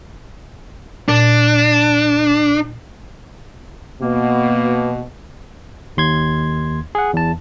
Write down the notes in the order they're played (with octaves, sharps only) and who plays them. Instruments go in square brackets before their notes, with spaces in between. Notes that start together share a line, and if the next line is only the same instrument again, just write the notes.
[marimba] A#2 [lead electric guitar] D4
[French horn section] B2 [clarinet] A#3
[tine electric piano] D#2 C6 G#6
G#4 F#5
E2 A5